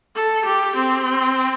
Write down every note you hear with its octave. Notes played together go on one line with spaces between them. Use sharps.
A4
G4
C4